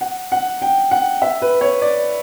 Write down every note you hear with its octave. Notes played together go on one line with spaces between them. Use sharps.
F#5
F#5
G5
F#5
E5
B4
C#5
D5